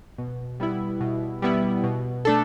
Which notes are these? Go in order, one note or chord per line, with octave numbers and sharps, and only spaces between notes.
B2
G3 B3 E4
B2
G3 B3 E4
B2
A3 D4 A4